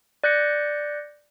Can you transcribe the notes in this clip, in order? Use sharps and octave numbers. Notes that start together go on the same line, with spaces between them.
D5 F#6 G6 A#6 C#7